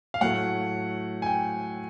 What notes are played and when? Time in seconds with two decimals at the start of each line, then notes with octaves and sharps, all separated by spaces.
0.14 F5
0.21 A2 F#3 A3 F#5
1.22 G#5
1.26 G5